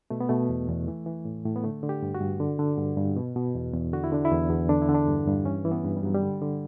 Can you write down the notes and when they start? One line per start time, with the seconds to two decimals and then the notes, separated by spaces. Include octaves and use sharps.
0.10 B2 A3
0.20 B3
0.29 B2 A3
0.49 E2
0.68 E2
0.88 E3
1.06 E3
1.25 A2
1.45 A2
1.56 B3
1.64 D3 A3
1.83 D3
1.89 G4
2.03 G2
2.15 F#4
2.21 G2
2.40 D3
2.59 D3
2.78 G2
2.97 G2
3.16 B2
3.36 B2
3.55 E2
3.73 E2
3.93 D3 F#4
4.04 E4
4.12 D3 D4
4.25 E4
4.31 E2
4.50 E2
4.69 D3 D4
4.82 E4
4.89 D3
4.94 D4
5.08 G2
5.27 G2
5.45 E3 C#4
5.65 E3
5.72 B3
5.84 G2
5.97 G3
6.03 G2 F#3
6.14 G3
6.22 D3
6.42 D3